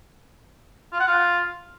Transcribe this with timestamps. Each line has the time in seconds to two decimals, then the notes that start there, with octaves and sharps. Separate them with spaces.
0.93 F4
1.00 F#5
1.07 F4